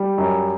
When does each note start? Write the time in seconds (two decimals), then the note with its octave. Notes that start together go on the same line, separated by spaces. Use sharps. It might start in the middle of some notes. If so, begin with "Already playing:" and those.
Already playing: G3
0.18 F#2